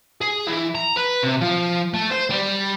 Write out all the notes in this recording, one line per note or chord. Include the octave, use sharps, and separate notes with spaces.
G#4
E3
A#5
B4
C3
F3
A3
C5
G3